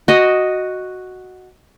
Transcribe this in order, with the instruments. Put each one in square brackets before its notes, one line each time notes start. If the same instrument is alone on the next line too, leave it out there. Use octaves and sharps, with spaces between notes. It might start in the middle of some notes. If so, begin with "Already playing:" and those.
[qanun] F#4 D#5